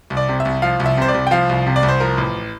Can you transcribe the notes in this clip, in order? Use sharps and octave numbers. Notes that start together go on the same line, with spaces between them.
C2
D5
C3
E5
C2
F3 F5
C2
E5
C3 C5
D5
C2
G5
F3 F5
C2
C3
D5
C2
C5
F3 A#4
A1